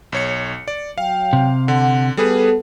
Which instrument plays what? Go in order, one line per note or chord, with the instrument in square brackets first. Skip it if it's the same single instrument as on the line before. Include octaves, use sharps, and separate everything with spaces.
[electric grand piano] B1 C#5 C#7
D5
[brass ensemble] F#3 G5 [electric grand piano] F5
[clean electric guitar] C3
[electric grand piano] D3 [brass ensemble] F#5
[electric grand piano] G3 G#4 B4 [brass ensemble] B3 A4